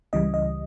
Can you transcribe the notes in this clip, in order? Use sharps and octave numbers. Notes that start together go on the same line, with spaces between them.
C#2 C#3 E3 G3 D#5
D#5